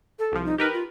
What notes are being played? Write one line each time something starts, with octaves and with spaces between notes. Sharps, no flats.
A4
C2 F3
D#4
D#4 G4 A#4 B4
F4